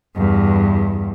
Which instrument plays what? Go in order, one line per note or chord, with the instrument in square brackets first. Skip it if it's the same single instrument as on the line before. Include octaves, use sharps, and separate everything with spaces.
[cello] E2 G2